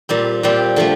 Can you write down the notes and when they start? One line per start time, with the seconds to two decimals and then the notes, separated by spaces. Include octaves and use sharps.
0.09 A#2 G3 C4
0.43 A#2 G3 C4
0.76 D3 F3 A3